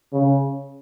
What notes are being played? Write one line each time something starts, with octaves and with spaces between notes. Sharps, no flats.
C#3